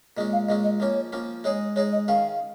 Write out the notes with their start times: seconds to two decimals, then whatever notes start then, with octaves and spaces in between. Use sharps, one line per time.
0.17 A#2 G#3 C#4 D#5
0.33 F5
0.48 A#2 G#3 C#4 D#5
0.64 D#5
0.80 F3 A#3 C#4 C#5
1.13 F3 A#3 C#4
1.44 G#3 D#4 G#4 C#5
1.76 G#3 D#4 G#4 C#5
1.92 D#5
2.08 D#3 C#4 G#4 F5